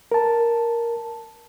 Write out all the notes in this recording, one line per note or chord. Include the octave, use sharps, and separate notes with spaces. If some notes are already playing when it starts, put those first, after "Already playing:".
A#4 A5